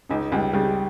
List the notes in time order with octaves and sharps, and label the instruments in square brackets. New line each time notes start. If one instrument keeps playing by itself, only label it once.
[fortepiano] C#2 [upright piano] D#4
[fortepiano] C#2 [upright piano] G3 G4
[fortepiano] C#3 [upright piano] G3 G4